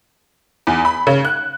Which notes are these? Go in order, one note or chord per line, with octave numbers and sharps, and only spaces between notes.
E2
B5
C#3
F#6